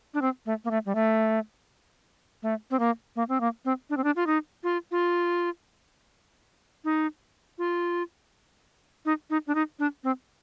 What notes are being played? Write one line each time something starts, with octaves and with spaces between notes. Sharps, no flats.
D4
C4
A3
A#3
A3
G3
A3
A3
C4
A#3
A#3
C4
A#3
C4
D4
C4
D4
F4
D#4
F4
F4
D#4
F4
D#4
D#4
D4
D#4
D4
C4